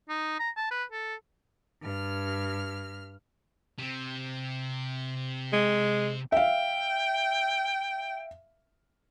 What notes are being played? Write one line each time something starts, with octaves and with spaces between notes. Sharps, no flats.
D#4
A#5
A5
B4
A4
G2 F6
C3 C4
G#3
E5 F5 G5